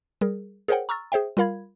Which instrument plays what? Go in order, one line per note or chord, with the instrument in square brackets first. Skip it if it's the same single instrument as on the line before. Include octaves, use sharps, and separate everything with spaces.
[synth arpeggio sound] G3 G#4 A#4
G#4 A#4 C5 C#5 F#5 G5
A#5 C#6 E6 F6 A6
G#4 C5 E5 G5
G3 F4 A#4 F5 B5 G#6